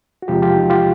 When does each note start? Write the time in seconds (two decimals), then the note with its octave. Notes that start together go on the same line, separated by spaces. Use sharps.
0.22 F#4
0.28 E2 C3 F3 G#3 F4 G4
0.42 F4 G4
0.56 D#4
0.64 F#4
0.70 F4 G4